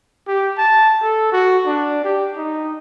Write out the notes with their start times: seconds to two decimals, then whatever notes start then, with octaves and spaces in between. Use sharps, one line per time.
0.27 G4
0.57 A5
1.03 A4
1.32 F#4
1.66 D4
2.04 G4
2.37 D#4